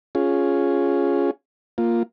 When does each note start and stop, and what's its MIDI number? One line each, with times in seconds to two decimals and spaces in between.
0.15 1.31 61
0.15 1.31 65
0.15 1.31 68
1.78 2.03 58
1.78 2.03 65